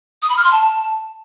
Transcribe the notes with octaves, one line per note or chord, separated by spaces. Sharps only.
D#6
B5
F6
C6
A5